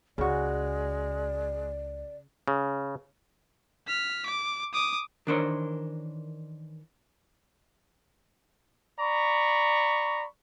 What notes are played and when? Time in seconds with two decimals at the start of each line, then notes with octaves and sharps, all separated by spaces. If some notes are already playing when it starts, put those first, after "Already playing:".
0.18 C#2 C#3 G#3 F#4 D5
2.48 C#3
3.87 F6 B6
4.26 D6
4.73 D6 D#6
5.27 D#3 E3 D4 A#4 C5 C#5
9.00 D5 A#5 B5 C#6